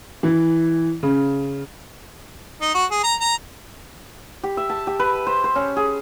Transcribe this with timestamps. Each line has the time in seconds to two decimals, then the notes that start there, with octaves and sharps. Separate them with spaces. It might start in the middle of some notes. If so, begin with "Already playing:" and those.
0.23 E3
1.03 C#3
2.61 D#4
2.75 F#4
2.91 G#4
3.04 A#5
3.21 A#5
4.44 G4
4.57 E5
4.70 A5
4.87 G4
4.99 B4
5.27 C5
5.44 C5
5.56 C#4
5.76 G#4